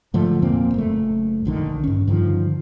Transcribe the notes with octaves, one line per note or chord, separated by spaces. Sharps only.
G#2 D3 F3 A3
E2 A#2 A#3 C4
F#1 A3
A#1 D3 D#3
G2 C#4
G2 D3 D#3 F3